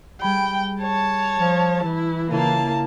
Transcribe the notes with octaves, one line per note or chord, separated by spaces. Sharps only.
G3 G#4 G5 B5
C#5 A5
F3
E3 E4
C#3 A#3 E4 F4 A5